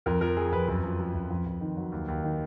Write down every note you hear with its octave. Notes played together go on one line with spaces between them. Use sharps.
F2 A#4
F3 A#4
F3 G#4
F2 B4
F#2 B4
F3
F3
F#2
F2
F2
D#3
F#3
D#2
D#2
D#3